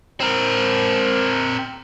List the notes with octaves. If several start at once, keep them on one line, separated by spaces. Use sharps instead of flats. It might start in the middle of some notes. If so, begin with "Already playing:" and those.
C4 A#4